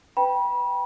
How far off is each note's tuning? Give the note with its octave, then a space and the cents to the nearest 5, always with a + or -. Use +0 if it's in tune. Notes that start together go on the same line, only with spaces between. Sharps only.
B4 +25 G5 +0 B5 -35